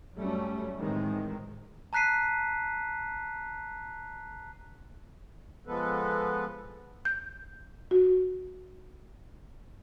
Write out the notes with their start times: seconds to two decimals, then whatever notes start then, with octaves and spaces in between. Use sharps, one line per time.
0.15 F#2 F#3 G3 A3 C#4
0.77 A2 D#3 E3 G#3 C4
1.93 A5 A#5 F#6 B6 C7 D#7
5.67 F3 G#3 B3 A4 B4
7.05 G6
7.91 F#4